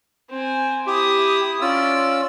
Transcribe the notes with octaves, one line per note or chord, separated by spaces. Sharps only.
C4 G#5
E4 G4 D#6
C#4 F4 D5 E6